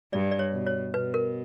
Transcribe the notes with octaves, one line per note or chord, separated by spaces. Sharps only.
G2 D5
D5
C#5
B2
C#5
B2 B4
A#4